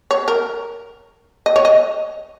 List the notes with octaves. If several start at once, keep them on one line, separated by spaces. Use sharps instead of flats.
C#5
A#4
D#5
C#5
D#5